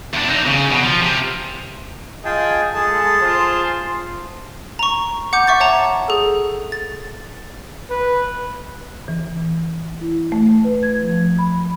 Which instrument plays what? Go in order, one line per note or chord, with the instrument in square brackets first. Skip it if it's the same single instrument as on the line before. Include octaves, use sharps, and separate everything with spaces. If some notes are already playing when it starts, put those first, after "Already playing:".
[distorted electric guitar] E2 D4
C4 D#4
C#3
B2
F3
C3
[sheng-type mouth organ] F4 G5 A5 [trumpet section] G#4 D#5
[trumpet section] G#3 A4 [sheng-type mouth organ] G#4 A5
[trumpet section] F4 C5
[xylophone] A#5 C#6
F#5 D6 G6
E5 C#6 D6 A6
C#5 F#5 A5 A#5
G#4 A4
A6
[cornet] B4
[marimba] E3
E4
A3
B4
G#6
F3
B5